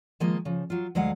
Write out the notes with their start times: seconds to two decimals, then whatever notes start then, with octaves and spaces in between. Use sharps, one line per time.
0.20 D#3 F3 G#3 A#3 D#5
0.45 C#3 F3
0.70 F#3 F4
0.95 D2 F#3 G#3 F5 F#5